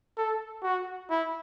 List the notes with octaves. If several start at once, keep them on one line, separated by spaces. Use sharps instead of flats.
A4
F#4
E4